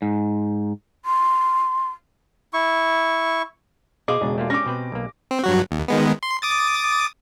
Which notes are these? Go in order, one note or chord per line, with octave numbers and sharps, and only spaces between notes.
G#2
C6
E4 C#6
B2 G#4 C5 D#5 F5 D6
E1 C#3 D4
A3 A#3 F4
C#4 D4 G4 C#5 D6 A#6
B2 C4 B4
B1 A#3
C4
G2 F#3 F#4
D#2
D#3 G#3 B3
C6
D6 D#6 A6